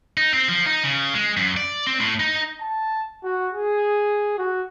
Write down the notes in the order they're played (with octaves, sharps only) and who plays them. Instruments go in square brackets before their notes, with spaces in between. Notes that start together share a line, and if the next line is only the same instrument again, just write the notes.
[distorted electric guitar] D#4
C4
F3
D#4
C#3
G#3
F#2
D5
C4
A2
D#4
[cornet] A5
F#4
G#4
F#4